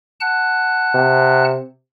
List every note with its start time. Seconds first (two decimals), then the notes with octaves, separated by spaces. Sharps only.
0.21 F#5 A5 F#6
0.94 C3